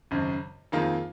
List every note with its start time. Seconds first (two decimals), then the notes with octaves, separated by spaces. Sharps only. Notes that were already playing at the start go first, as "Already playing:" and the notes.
0.11 G#1 F#2 C#3
0.72 F2 D#3 A#3 F4 G#4